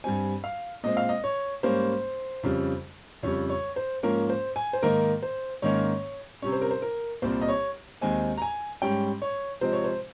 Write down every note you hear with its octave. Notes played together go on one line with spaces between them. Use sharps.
G2 G3 C4 G#5
F5
A#2 G#3 C4 D#5
F5
D#5
C#5
G#2 G3 A#3 C#4 C5
F2 C#3 G3
F2 C#3 G3 C#5
C#5
C5
G#2 F3 A#3 C#4 A#4
C5
G#5
C5
G#2 D#3 A#3 A#4
C5
G#2 D#3 A#3 C#4 C#5
C3 G3 C#4 C#5
C5
A#4
C5
A#4
C2 A#2 G3 C4 C5
D#5
C#5
D#2 D#3 G#3 C4 G#5
A#5
G#5
G#2 G3 C#4 G5
C#5
C3 F3 G#3 C4 C5
C#5
C5